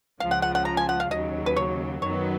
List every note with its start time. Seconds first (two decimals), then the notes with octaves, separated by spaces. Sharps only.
0.20 C#2 C#3 F3 F5
0.31 F#5
0.42 F#5
0.55 F#5
0.65 A#5
0.77 G#5
0.89 F#5
1.00 F5
1.11 D#2 C#3 F#3 D#5
1.46 B4
1.56 C#5
2.02 F#2 D#3 F#3 B3 C#5